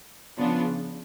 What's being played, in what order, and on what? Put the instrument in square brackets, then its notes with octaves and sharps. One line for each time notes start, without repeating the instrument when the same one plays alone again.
[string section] C#3 F3 B3 D4 F4